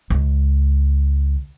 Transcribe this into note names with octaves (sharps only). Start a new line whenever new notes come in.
C#2